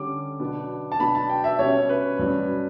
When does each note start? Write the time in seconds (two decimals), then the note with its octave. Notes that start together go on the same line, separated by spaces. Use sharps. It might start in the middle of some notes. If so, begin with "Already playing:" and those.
Already playing: D3 G3 C#4 D6
0.40 B2 F#3 B3 D4
0.92 A5
1.00 B2 F#3 B3 D4 B5
1.15 A5
1.30 G5
1.44 E5
1.59 B2 G3 C#4 C#5
1.89 B4
2.19 G2 F#3 C#4